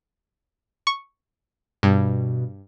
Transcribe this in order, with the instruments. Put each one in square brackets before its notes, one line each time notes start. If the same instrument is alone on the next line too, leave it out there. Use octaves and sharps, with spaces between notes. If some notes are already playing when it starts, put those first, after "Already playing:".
[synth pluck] C#6
[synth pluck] G2 [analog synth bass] B2